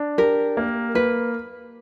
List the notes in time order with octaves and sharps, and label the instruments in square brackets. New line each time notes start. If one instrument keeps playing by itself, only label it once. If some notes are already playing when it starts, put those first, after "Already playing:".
Already playing: [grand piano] D4
[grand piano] G4 [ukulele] A#4
[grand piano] A#3
[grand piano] A#3 [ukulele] B4